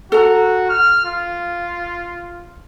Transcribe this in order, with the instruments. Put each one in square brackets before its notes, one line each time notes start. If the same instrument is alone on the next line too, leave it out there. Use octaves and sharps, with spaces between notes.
[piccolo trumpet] F#4 [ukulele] A4 A#5
[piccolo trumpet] F6
F4